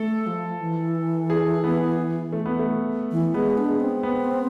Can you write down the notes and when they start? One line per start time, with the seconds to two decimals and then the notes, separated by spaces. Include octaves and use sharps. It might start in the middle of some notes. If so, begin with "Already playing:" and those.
Already playing: A3 A4
0.27 F3
0.61 E3
1.30 G#4
1.64 B3
2.33 A3
2.46 B3
2.59 A3
3.11 E3
3.34 G#3 B3
3.57 D4
3.69 G#3
3.80 C4
4.03 B3